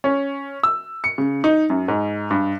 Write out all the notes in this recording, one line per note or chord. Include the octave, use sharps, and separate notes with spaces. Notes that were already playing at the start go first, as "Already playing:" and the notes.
C#4
E6
C#7
C#3
D#4
F#2
G#2
G2